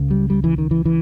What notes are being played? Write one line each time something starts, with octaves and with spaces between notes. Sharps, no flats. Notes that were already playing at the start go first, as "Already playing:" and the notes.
Already playing: C#2 C#3
G3
G3
E3
D#3
E3
E3